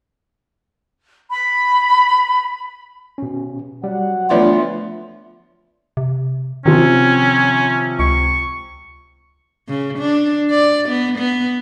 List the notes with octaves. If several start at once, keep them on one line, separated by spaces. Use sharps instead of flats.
B5
B2 C#4
F#3 G3 F#5
D2 F3 A3 B3 D4 F4 C#5
C3
C3 D#3 F3 C#4
C#2 C#6
C#3
D4
D5
B3
B3